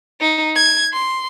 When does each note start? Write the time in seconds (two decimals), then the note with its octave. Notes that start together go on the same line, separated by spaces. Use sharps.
0.21 D#4
0.56 G#6
0.93 C6